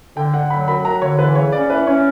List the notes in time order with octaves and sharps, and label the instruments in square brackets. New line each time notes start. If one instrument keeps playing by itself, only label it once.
[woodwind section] D3 [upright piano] G5
[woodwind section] D3 [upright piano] F#5
[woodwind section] F#3 [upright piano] B5
[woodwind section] F#2 [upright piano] B5
[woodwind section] F#2 [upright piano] A#5
[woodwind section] D3 [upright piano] C#5
[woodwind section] E3 [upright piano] B4
[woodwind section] C#3 [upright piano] C#5
[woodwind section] C#4 [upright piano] D5
[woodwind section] E3 [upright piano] B4
[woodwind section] C#4 [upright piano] C#5